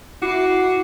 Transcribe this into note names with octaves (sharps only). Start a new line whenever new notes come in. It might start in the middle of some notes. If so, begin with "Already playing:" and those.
E4 F#4 D6 C7